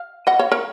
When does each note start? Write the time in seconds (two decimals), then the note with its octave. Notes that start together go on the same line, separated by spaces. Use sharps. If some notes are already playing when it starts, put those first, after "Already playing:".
Already playing: F5
0.27 D#5 F#5
0.39 C#5 F5
0.52 A#4 C#5